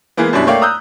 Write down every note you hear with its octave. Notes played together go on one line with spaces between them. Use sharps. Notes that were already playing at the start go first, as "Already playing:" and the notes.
E3 G#3 A#3 B3
F#2 B2 F#3 G3 D4 E4
A3 A#3 C#5 D5 F5 G5
A#5 D#6 E6 F#6 G6